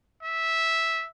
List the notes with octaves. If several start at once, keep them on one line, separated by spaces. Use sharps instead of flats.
E5